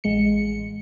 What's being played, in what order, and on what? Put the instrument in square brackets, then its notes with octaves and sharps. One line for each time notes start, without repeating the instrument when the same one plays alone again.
[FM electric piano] A1 G#3 C#7